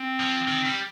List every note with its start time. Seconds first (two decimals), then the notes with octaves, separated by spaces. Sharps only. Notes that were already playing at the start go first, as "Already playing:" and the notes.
Already playing: C4
0.20 F3
0.48 D#3
0.66 G3